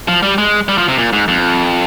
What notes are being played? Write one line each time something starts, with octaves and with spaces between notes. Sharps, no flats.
F3
G3
G#3
G3
F3
C3
A#2
G#2
F2